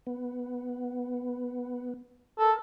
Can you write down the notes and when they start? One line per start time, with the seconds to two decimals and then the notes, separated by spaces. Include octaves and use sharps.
0.07 B3
2.39 A4 A#4